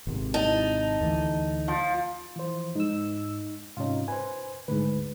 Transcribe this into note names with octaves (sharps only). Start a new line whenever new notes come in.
G#1 C3
D#4 A5
D2 E3 A3
F3
E3 F3 C5
G#2 D#4 E6
G#2 C3 C#4 D#4 F4
B4 C5 G#5
D2 G#2 B4